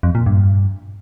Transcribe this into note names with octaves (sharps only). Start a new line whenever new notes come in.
F2
A#2
G2